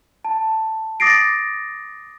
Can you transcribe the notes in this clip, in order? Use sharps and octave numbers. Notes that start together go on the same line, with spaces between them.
A5
D6 D#6 A6 A#6 C7 D7